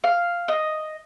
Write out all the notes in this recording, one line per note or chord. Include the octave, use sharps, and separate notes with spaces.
F5
D#5